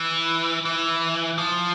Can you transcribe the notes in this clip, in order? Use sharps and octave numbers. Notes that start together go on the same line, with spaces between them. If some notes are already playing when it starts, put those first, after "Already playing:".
Already playing: E3
E3
F3